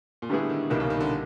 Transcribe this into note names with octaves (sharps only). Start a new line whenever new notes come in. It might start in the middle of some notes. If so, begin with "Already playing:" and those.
A#2
A2 D3 G3 B3 E4 G#4
D#3
C2 B2 D#3 G3 A#3
C#3
D#3
D3